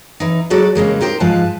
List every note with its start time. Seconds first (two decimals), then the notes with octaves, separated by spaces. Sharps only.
0.20 E3 D#4
0.50 F#3 G#3 F#4 A4 D5
0.75 C#3 G3 G#3 A#3
1.01 D#4 G4 A#4 C5
1.20 G#2 F3 G#3 B4 F5 A5